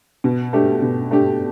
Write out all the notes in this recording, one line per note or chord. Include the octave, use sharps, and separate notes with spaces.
B2
A3 D4 G4
B2
A3 D4 G4